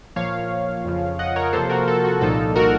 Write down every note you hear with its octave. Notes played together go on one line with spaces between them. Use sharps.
A#2 F3 A#3 C#5 F5
F2 C#3 F3
D#5 F#5
A#4 C#5
C3 F3 A#3 A4 C5
F#4 A#4
A4
F#4
C2 A#2 F3 A#3 D#4 A4
F#4 A#4